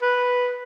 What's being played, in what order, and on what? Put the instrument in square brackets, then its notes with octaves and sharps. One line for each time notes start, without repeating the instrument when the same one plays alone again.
[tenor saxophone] B4